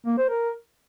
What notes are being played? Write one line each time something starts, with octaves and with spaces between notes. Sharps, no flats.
A#3
C5
A#4